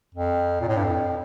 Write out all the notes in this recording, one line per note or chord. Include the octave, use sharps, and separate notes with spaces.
F2
A#2
A2
G2
F2